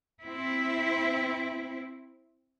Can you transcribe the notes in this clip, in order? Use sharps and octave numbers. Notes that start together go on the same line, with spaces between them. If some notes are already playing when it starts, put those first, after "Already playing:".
C4 E4